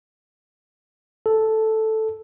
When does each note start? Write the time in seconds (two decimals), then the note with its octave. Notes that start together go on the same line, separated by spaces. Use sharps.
1.26 A4